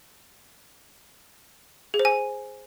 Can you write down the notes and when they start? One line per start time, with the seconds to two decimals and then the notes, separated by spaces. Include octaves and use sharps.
1.94 G#4
1.99 C5
2.05 G#5